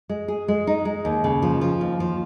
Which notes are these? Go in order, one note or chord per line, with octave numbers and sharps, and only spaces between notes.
G#3
G#4
G#3
D#4
G#3
D#2
C#3
F3
F3
D#2
F3